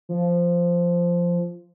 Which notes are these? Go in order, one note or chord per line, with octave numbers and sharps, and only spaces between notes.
F3